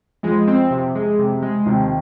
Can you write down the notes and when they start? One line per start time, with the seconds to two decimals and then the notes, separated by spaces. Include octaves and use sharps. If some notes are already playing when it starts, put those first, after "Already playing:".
0.23 F2 F3 G#3
0.47 C4
0.71 C3
0.95 G#3
1.19 C3
1.42 G#3
1.66 D#2 C3 D#3